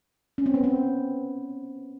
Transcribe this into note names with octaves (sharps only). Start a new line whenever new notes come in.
C#4
C4
B3
C4